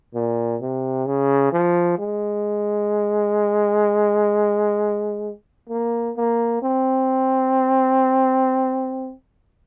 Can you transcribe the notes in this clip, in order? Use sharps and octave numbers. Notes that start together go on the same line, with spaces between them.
A#2
C3
C#3
F3
G#3
A#3
A#3
C4